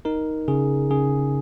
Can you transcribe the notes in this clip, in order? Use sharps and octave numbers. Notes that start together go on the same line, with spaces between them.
D#4 A#4
C#3 G#4
C#3 G#4